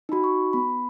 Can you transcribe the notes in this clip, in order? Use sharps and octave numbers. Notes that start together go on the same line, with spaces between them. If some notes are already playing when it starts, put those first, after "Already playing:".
D#4 F#4 B5
C#6
B3 B5